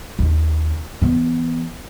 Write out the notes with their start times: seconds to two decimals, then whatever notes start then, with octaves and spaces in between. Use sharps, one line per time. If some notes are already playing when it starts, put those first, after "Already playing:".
0.19 D#2
1.02 E3 B3